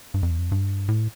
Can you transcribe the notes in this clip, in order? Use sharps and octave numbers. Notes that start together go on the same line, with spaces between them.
G2
F2
E2
F2
G2
A2